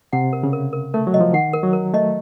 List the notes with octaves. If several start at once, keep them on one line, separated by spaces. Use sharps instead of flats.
C3 F#5
A#4
C#3
A#4
A#4
A3 A#4
F#3
D#5
F3
D#3 F#5
A#4
F#3
A#4
A3 D#5